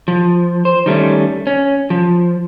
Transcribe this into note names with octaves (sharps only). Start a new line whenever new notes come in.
F3
C5
D#3 G3 A3 C#4
C#4
F3